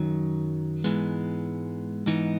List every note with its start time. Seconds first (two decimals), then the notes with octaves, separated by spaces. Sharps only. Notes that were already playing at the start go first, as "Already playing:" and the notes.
Already playing: F#2 D#3 F#3
0.84 G#2 E3 G#3 B3
2.06 G#2 E3 B3 D#4